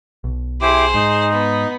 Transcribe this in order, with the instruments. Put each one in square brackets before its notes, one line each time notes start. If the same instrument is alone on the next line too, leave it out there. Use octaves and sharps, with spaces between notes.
[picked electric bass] B1
[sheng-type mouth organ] E4 G4 D6 [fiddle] G#4 C5
[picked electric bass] G#2 [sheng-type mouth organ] D#4
[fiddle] B3